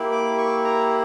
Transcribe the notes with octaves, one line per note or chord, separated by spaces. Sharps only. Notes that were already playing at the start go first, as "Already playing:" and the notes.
Already playing: A#3 E4 G4
D6
C#6
A#5